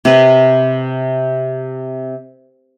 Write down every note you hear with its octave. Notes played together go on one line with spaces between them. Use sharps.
C3 B4